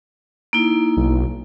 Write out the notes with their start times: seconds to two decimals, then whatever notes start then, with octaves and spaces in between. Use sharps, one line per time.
0.53 A#3 D#4 E4
0.97 B1